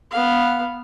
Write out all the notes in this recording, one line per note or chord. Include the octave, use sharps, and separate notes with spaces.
B3 F5